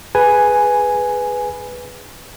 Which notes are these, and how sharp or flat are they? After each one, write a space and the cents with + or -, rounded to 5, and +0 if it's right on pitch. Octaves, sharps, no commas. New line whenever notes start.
G#4 +0 B4 +0 G#5 +0